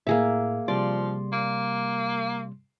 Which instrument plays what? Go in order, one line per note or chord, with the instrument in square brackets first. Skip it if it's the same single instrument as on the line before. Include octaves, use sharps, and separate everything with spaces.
[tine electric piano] A2 [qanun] A#3 G#4 E5
[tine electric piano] C3 G3 C6 [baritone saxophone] F3 [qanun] D5
[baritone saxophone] A#3